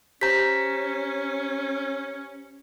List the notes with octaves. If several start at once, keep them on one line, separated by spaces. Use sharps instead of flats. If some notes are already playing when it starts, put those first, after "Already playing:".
C#4 G4 C5 A#5 G6 B6